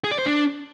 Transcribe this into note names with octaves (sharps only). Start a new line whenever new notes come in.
G#4
D5
C5
D4